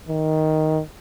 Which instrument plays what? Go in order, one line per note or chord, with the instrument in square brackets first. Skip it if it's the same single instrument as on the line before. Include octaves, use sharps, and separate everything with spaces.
[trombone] D#3